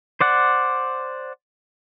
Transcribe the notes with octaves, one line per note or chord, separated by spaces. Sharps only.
C5 D5 F#5